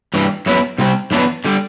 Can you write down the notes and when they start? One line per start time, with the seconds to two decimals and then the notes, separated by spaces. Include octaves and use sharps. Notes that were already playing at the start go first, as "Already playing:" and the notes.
0.14 G2 E3 G3
0.46 F#2 F#3 B3 E4
0.78 C3 G3 C4
1.11 F#2 E3 B3 D4
1.45 D3 G3